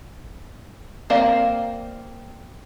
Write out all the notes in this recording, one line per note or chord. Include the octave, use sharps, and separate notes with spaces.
A#3 C4 A#4 D5 F5